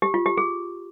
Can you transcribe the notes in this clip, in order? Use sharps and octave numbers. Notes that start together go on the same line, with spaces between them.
G4
F4
G4
G#4